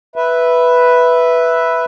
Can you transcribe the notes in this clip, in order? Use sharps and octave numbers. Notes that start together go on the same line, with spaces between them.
B4 E5